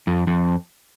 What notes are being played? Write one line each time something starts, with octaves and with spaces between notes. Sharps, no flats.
F2
F2